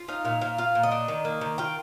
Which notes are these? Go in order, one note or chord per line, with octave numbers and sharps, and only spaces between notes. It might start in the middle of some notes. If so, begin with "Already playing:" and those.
Already playing: F4
D#4 F5
A#2 F5
A#2 F5
F4 F5
A#2
D#5
D4
D#3
A#3
D#3
F4 G5